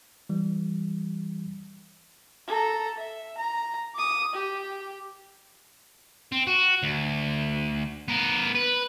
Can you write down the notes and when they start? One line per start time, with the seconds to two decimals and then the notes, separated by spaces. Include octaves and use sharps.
0.29 E3 G3
2.47 A4 A#5
2.97 E5
3.38 A#5
3.95 D6 D#6
4.33 G4
6.32 C4
6.47 F#4
6.83 D2
8.08 B3 A#4
8.55 B4